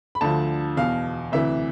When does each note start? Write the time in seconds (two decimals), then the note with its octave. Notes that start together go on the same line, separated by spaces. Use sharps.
0.15 B5
0.21 D2 D3 F3 A5
0.77 E2 B2 F5
1.32 D2 C3 E3 E5